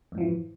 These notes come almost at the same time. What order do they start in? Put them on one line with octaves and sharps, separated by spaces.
F2 G#2 F3 E3